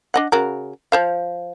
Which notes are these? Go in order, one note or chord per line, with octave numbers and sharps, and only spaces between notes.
D4 D#5 F#5
C#3 F#4 A#4
F3 C5 F5